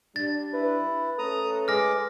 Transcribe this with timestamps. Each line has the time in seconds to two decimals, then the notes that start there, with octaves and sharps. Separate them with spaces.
0.16 G3 D4 A6
0.53 E4 B4
1.19 A3 C#4 A4 A#5 D#6
1.68 G#3 G#4 D6 F6 A#6